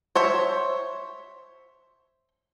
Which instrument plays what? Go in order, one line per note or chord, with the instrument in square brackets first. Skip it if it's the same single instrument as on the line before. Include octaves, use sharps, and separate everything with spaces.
[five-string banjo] C5 C#5 E5